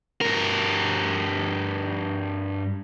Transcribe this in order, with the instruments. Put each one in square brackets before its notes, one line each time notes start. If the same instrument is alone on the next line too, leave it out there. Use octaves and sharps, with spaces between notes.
[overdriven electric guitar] G2 A#4